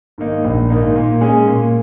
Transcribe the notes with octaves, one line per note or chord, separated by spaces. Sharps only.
G#2 D#3 A#3 D#4
A#1
G#2 D#3 A#3 D#4
A#2
G#3 C#4 G#4
A#2